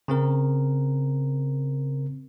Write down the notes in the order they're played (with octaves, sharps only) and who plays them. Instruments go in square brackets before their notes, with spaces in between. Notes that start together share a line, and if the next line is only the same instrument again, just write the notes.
[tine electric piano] C#3 C4 A#4